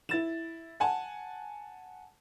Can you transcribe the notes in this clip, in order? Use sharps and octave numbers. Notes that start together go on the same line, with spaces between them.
E4 A6 E7
F#5 G#5 A5